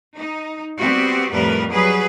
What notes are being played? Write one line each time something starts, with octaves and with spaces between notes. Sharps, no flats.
D#4
G3 B3 C4 F#4 G4
F2 A2 G3 A#4 B4
F#3 G3 G#4 B4